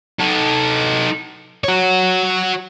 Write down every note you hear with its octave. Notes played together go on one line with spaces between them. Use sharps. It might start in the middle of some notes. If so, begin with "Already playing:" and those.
D#4 A4
F#4 C#5